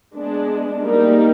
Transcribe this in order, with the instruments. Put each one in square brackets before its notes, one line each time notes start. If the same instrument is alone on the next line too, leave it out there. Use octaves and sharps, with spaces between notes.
[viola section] G#3 B3 D4
G3 A#3 D#4 G4